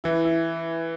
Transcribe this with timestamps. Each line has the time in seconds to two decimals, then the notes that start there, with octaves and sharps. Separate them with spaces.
0.04 E3 E4
0.25 E4